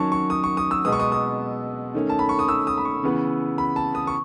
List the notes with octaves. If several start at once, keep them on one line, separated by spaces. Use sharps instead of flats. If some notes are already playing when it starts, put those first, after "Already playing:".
Already playing: D#3 F#3 C#4 A5 C#6
C#6
D#6
C#6
D#6
E6
B2 G#3 B3 D#6
C#6
D#6
D#6
D#3 A3 C#4
A5
B5
C#6
D#6
E6
D#6
B5
C#6
C#3 E3 B3
B5
A5
D#6
C#6